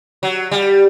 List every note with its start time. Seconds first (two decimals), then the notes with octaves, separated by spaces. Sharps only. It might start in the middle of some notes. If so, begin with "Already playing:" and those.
0.23 F#3
0.51 G3